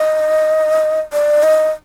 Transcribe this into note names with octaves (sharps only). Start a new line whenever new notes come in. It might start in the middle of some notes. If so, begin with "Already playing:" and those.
Already playing: D#5
D5
D#5